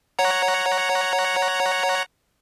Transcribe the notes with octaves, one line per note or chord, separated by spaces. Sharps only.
C#5 F#5 A#5